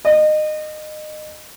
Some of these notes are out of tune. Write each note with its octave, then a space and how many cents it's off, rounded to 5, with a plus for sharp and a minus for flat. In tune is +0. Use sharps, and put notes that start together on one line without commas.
D#5 -25